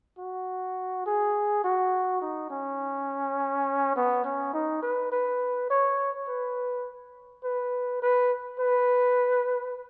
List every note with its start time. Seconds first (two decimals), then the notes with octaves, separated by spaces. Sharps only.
0.18 F#4
1.06 G#4
1.64 F#4
2.21 D#4
2.50 C#4
3.96 B3
4.25 C#4
4.54 D#4
4.82 B4
5.12 B4
5.70 C#5
6.28 B4
7.44 B4
8.02 B4
8.60 B4